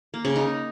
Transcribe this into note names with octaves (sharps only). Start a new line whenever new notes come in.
A#3
C#3
D#4